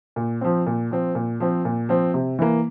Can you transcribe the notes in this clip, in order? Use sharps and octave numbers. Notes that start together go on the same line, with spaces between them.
A#2
F3 C4
A#2
F3 C4
A#2
F3 C4
A#2
F3 C4
C3
E3 A#3